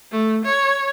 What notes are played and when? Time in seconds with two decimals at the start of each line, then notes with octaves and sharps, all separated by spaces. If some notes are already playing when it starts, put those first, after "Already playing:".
0.12 A3
0.45 C#5